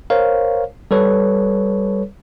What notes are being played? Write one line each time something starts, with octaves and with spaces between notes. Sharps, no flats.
A#4 C5 C#5 F5
G3 A4 B4 C#5